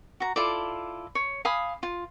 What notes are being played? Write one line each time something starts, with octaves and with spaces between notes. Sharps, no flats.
F#4 A#5
E4 F4 A4 D5
C#5
F5 G#5 B5 D#6
F4